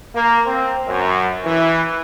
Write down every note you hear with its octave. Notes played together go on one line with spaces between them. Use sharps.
A#3
C4
F#2
E3